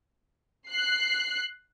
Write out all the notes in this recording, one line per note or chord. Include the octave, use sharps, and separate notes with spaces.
F#6 C7